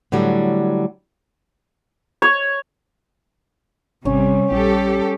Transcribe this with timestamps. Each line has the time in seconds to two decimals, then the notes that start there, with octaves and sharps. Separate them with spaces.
0.12 A2 D3 F#3 G3
2.22 C#5
4.05 G#1 C3 G3 C#4
4.51 A#1 G3 G4 A4